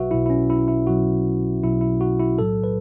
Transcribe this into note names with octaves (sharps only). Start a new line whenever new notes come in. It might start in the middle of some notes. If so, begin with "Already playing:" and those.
Already playing: B1 B2 F#3 F#4 B4 E5
B1 B2 F#3 E4
E4
C#4
E4
E4
B1 B2 F#3 F#4
B1 B2 F#3 E4
E4
F#4
E4
B1 A2 F#3 A4
B4